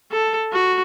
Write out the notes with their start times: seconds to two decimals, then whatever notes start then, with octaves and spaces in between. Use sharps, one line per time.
0.12 A4
0.53 F#4